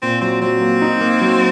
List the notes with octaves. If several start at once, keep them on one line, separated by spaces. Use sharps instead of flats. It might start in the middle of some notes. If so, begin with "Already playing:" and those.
A#2 C4
F#3 C4
F#3 C4
A#3
D#4
A#3
F#3